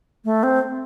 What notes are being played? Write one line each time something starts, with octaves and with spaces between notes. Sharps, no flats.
A3
C4